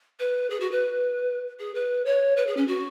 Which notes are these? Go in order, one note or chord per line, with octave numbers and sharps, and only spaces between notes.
B4
G#4
F#4
B4
G#4
B4
C#5
B4
G#4
C#4
F#4